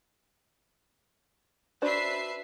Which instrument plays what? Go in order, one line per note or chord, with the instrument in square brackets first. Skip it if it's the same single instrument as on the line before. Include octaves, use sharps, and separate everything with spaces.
[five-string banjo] D4 F#4 C5 [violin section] B4 E5 C7